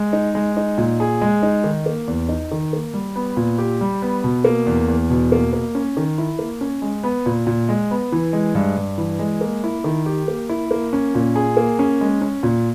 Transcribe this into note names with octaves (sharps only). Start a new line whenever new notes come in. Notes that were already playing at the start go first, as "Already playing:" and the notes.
Already playing: G#3
D#4
G#3
D#4
A#2
G#4
G#3
D#4
D#3
A#3
E2
D#4
D#3
A#3
G3
B3
A#2
G4
G3
B3
B2
A#3
E2
E2
B2
A#3
A#3
C#4
D#3
E4
A#3
C#4
G#3
B3
A#2
A#2
G#3
B3
E3
G#3
G2
G2
E3
G#3
A#3
E4
D#3
G4
A#3
E4
A#3
C#4
A#2
G#4
A#3
C#4
G#3
C#4
A#2